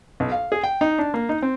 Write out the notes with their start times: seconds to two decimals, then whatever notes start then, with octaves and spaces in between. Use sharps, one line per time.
0.20 B1
0.32 F5
0.52 G#4
0.63 G5
0.81 D#4
0.99 D4
1.14 A#3
1.29 D#4
1.42 C4